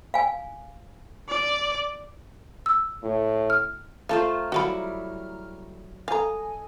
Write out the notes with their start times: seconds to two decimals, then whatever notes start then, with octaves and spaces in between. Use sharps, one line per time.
0.14 F5 G#5
1.29 D5
2.66 E6
3.03 A2
3.50 F6
4.09 A3 F4 A4 C5 F5 A#5 F6
4.52 F#3 G3 E4 F#4 F5 B5
6.08 A4 D#5 F5 G#5 A#5